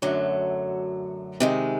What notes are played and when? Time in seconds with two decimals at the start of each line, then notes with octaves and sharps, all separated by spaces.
0.02 F#2 D3 F#3 A3
1.40 C3 D#3 G#3